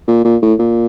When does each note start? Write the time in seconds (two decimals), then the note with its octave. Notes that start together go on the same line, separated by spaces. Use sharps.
0.08 A#2
0.25 A#2
0.42 A2
0.59 A#2